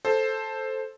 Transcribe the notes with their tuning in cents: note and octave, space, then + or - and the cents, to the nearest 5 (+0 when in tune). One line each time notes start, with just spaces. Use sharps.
A4 +0 C5 +5